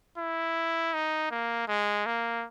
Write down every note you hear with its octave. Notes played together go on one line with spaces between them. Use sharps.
E4
D#4
A#3
G#3
A#3